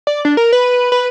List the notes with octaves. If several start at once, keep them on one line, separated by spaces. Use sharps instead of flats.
D5
D4
A#4
B4
B4